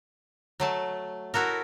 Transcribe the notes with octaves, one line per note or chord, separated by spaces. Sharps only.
F#3 A3 A5
E4 F#4 A4 A#4